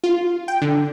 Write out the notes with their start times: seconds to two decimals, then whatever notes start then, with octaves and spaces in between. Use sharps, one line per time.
0.04 F4
0.48 G5
0.62 D3